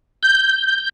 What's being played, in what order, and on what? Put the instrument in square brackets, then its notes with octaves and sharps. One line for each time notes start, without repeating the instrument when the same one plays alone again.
[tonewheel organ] G6